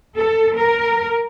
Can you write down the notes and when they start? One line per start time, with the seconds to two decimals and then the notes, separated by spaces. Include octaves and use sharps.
0.16 A4
0.56 A#4